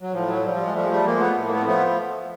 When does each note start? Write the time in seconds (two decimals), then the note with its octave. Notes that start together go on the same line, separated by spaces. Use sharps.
0.01 F#3
0.13 A2 F3
0.27 F#3
0.43 F3 G3
0.54 G3
0.64 G#3
0.74 F3 G3 A3
0.83 G#3
0.89 G3 A3
1.05 F3 G#3 A#3
1.19 A3 B3
1.35 A2
1.45 A#3
1.51 A3 B3
1.61 C4
1.65 F3 A3 B3